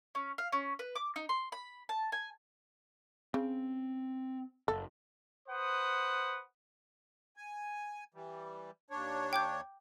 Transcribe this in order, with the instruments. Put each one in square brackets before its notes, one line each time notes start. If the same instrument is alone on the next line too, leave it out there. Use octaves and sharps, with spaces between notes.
[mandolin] C#4
F5
C#4
B4
D6
D#4
C6
B5
A5
G#5
[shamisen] C#3 [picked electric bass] C4
[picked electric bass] F#1 [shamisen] A4
[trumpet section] B4 C5 F#5 D#6
[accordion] G#5
E3 G3
D#2 D4 C#5
[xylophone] G5 D6 G6